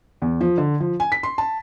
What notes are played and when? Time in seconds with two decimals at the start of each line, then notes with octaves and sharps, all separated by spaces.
0.22 E2
0.41 F3
0.58 D3
0.80 F3
1.00 G#5
1.12 B6
1.23 C6
1.38 A5